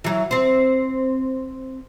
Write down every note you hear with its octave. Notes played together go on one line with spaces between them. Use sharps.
E3 F#3
C4 C5